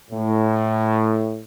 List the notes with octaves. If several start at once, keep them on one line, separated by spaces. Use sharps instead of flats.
A2